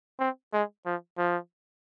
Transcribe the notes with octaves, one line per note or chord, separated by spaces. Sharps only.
C4
G#3
F3
F3